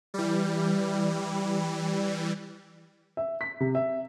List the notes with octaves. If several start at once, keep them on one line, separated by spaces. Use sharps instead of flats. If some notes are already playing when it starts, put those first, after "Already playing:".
E3 G3
E5
B6
C3
E5